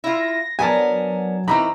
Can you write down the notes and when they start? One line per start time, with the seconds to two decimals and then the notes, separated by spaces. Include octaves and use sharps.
0.04 E4 F4 A#6
0.59 F#3 B3 D4 A#4 G#5 A5
1.48 D#3 E3 C4 A#5 B5